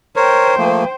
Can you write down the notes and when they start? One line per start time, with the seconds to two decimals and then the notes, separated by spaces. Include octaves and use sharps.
0.16 A#4 C5 C#5 G5
0.58 F3 A3 A#3